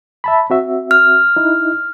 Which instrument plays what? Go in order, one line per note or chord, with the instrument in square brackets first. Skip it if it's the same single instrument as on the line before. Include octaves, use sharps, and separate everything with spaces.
[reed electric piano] E5 A5 B5
C4 F#4 E5
[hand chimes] F6
[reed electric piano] D#4 E4